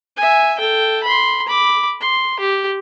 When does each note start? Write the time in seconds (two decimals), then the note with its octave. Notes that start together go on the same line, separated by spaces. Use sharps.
0.17 E5 G#5
0.59 A4 G5
1.03 B5 C6
1.47 B5 D6
2.01 C6
2.40 G4